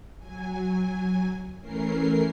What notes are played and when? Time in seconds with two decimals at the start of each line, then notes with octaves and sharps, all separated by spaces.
0.19 F#3 G#5
1.60 E3 A3 C#4 A#4 C7